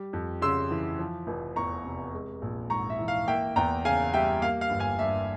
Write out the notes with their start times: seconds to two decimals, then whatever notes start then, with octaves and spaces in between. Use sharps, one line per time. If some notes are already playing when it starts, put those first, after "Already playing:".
Already playing: G3
0.13 F2
0.42 C#3 C6 E6
0.71 E3
0.99 F3
1.27 F1
1.56 E2 A#5 C#6
1.84 C3
2.14 G#3
2.42 A#1
2.70 G#2 A#5 C#6
2.90 E5
2.99 E3
3.08 F5
3.27 A#3 E5 G5
3.56 E2 G5 A#5
3.85 C#3 F5 G#5
4.13 G3 E5 G5
4.41 A#3 F5
4.61 F5
4.70 G1
4.80 F5 G#5
4.99 G2 E5